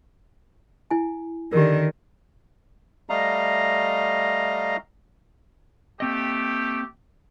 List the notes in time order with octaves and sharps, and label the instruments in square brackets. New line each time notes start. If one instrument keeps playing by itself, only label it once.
[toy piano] E4 G#5
[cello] D3 D#3 [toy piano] G4 A#4
[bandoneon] G3 A3 D#5 F5 A#5
[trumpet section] A3 G4 [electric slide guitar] A#3 C4 D#5